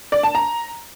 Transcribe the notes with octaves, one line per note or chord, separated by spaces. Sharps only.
D5
A5
A#5